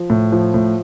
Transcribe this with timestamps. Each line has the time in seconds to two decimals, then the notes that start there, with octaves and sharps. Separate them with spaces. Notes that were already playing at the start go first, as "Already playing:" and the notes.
Already playing: F3
0.10 A2
0.32 F3
0.54 A2